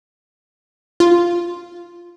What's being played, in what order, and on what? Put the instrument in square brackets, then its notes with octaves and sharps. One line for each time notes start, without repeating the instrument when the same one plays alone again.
[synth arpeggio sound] F4